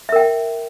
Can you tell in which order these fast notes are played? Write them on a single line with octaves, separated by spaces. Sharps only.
E5 A#4 G5